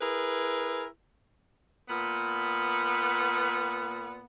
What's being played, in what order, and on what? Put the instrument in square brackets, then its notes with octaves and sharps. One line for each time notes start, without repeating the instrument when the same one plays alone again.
[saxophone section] E4 G#4 A#4 B4
A#2 B3